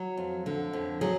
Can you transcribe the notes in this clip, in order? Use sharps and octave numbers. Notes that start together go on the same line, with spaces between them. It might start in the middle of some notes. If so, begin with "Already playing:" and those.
Already playing: F#3
F2
D3
F2
F#3 G#4